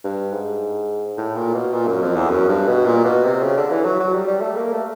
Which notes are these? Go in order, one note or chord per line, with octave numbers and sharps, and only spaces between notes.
G2
G#2
A2
A#2
B2
A#2
F#2
F2
E2
F#2
G2
B2
A#2
B2
C3
C#3
D3
E3
F#3
F#3
G3
G3
A3
A#3
A3